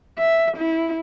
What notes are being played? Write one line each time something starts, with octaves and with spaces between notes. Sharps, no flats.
E5
E4